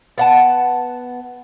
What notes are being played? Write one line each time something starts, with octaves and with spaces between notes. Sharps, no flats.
B3 F#5 A5